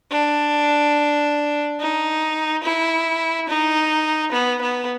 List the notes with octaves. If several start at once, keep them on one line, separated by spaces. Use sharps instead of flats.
D4
D#4
E4
D#4
B3
B3